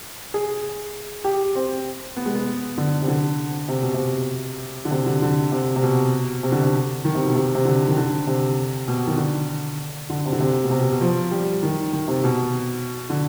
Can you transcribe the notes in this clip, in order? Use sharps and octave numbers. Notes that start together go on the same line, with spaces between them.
G#4
G4
C4
B3
G#3
B3
D3
C3
D3
C3
B2
C3
D3
C3
D3
D3
C3
C3
B2
C3
D3
C3
D#3
C3
B2
C3
C3
D3
D#3
D3
C3
B2
D#3
D3
D3
C3
D3
C3
B2
C3
B2
B2
F3
G3
D#3
D#3
C3
B2
D3